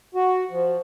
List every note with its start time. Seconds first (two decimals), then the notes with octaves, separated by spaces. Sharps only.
0.15 F#4
0.51 F3